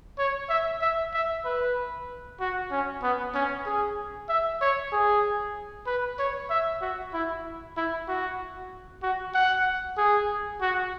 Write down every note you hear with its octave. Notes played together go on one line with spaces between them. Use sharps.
C#5
E5
E5
E5
B4
F#4
C#4
B3
C#4
G#4
E5
C#5
G#4
B4
C#5
E5
F#4
E4
E4
F#4
F#4
F#5
G#4
F#4